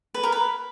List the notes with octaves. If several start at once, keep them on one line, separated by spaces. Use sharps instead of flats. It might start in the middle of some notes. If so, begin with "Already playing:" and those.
B4
A#4
B4